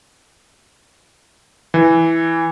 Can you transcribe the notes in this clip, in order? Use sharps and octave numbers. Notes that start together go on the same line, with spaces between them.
E3